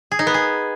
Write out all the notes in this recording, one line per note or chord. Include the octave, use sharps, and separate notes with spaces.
G#4
D#4
B3
G#4